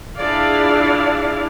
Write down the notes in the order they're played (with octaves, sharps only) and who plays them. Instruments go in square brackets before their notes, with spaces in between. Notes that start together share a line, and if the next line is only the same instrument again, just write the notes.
[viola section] D4 E4 F4 G#4 D5 F5